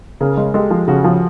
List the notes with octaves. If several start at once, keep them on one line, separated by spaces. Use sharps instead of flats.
C#3 G#4 A#4
G#3
G#3 G4 A4
F3
C#3 F#4 G#4
F3